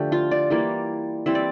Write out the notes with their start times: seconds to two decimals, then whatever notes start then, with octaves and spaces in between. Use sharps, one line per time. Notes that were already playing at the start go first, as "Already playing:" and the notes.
Already playing: D3 F3 A3 G4
0.12 F4
0.31 D5
0.50 E3 G3 A#3
1.26 E3 G3 C4 E5
1.35 D5